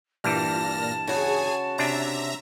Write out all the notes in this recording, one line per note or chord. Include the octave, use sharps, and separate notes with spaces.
G2 A#2 E3 G3 A5 F6 A#6
C#3 F#4 G#4 G#5
C3 D4 E5 G#5 A#5